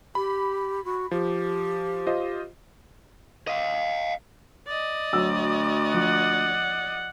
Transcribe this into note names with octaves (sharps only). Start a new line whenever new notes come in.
G4 B5
F#4
F3 G4
F4 C5 D#5
D#5 F5
D5 D#5
D2 F#3 E6
F3 F#5